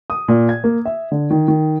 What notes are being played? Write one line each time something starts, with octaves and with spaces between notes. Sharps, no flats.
D#6
A#2
G#6
A#3
E5
D3
D#3
D#3